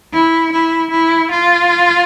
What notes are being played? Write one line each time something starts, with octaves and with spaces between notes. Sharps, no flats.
E4
E4
E4
F4